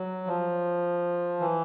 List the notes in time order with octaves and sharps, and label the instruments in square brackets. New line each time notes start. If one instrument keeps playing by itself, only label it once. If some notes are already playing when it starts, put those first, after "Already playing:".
Already playing: [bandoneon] F#3
F3
E3